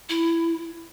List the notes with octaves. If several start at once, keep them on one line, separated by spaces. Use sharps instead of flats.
E4